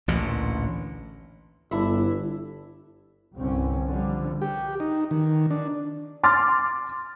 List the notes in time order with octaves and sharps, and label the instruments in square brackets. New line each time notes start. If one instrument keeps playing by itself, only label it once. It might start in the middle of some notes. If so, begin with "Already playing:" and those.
[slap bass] A1 D2 A#2
[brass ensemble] G1 [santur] D4 E4 E5
[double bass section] C2 G2 D3 C4 C#4
D3 F3 G3
[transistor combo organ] G4
D#4
D#3
D4
[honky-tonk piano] C6 D6 F6 A6